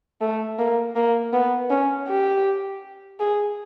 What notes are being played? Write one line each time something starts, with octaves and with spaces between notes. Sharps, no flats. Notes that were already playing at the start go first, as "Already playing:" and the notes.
A3
A#3
A#3
B3
C#4
G4
G#4